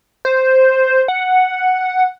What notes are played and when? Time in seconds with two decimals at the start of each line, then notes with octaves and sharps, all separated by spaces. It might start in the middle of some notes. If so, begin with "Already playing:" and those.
0.25 C5
1.08 F#5